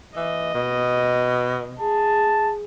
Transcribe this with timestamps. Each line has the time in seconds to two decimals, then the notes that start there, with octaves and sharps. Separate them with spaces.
0.16 E3 D#5
0.54 B2
1.80 G#4 A5